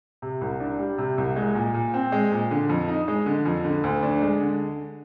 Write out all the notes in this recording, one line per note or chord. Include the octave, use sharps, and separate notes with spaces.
C3
C2
D4
G3
C3
C2
G#3
A#2
A#2
C4
G#3
A#2
D3
F2
D#4
G#3
D3
F2
D3
D2
D4
G#3
D3